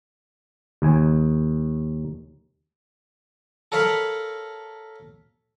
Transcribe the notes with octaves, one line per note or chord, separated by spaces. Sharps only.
D#2 G#5
A4 A#4 C#5 F5 B5